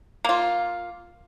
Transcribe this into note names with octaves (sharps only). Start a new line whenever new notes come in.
A#3 F4